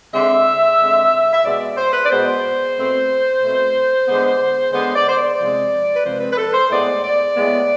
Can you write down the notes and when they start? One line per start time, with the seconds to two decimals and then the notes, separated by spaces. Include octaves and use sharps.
0.13 D3 G#3 C4 E5
0.79 D3 G#3 C4
1.33 E5
1.44 B2 G#3 B3 D5
1.60 D5
1.76 C5
1.93 B4
2.04 D5
2.09 B2 G#3 B3 C5
2.76 B2 A3 C4
3.42 B2 A3 C4
4.08 D3 G#3 B3
4.73 D3 G#3 B3 C5
4.95 D5
5.08 C5
5.16 D5
5.39 C3 F3 G#3 C4
5.95 B4
6.05 C3 F3 G#3 C4 C5
6.20 B4
6.31 B4
6.37 A4
6.53 C5
6.70 A2 G#3 B3 D5
7.03 D5
7.37 A2 G#3 B3